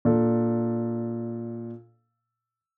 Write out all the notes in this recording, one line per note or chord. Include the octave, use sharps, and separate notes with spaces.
A#2 D4 A4